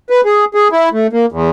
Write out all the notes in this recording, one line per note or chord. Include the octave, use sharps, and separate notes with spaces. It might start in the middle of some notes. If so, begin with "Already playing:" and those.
B4
G#4
G#4
E4
A3
A#3
E2